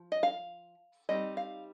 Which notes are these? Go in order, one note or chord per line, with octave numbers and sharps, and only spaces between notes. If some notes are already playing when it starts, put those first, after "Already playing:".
Already playing: F3
D#5
F5
G3 C4 D#4 D#5
F5